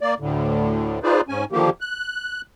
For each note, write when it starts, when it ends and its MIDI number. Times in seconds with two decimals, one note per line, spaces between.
0.01 0.14 58
0.01 0.14 74
0.20 0.99 38
0.20 0.99 45
0.20 0.99 50
1.03 1.21 63
1.03 1.21 65
1.03 1.21 68
1.03 1.21 71
1.03 1.21 72
1.03 1.21 74
1.29 1.45 44
1.29 1.45 61
1.29 1.45 80
1.52 1.70 50
1.52 1.70 51
1.52 1.70 53
1.52 1.70 58
1.52 1.70 67
1.81 2.41 90